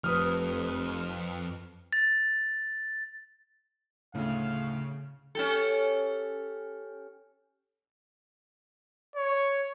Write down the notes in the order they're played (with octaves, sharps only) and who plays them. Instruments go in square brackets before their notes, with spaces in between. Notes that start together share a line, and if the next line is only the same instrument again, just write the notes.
[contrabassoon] F1 [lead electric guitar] F2 [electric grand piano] B4 D#6 F6
[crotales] A6
[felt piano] D2 A2 [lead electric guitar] C#3 [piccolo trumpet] F5
[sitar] C#4 G4 A4
[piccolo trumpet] C#5